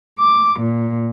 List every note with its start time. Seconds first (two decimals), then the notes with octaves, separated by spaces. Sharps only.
0.19 D6
0.60 A#2